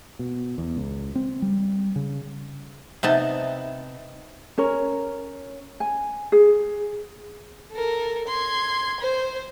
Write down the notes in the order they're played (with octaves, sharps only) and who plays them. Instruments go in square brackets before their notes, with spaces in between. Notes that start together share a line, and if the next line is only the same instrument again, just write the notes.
[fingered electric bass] B2
E2
C#2
C4
G3
C#3
[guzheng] C3 B3 D#4 A5
[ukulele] C#4 A#4 C#5
G#5
G#4
[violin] A4 A#4
C6 G#6
C5